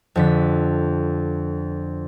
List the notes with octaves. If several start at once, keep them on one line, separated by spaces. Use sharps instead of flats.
F2 D3 B6